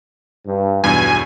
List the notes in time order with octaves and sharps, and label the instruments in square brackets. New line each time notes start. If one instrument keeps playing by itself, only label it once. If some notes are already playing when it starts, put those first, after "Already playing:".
[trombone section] G2
[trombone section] B1 B2 [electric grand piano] E2 G2 [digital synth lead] G#5